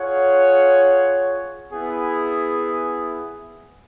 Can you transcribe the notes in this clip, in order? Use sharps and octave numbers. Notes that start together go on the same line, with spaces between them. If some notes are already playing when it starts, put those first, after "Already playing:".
Already playing: F4 G#4 C#5 F#5
B3 E4 G#4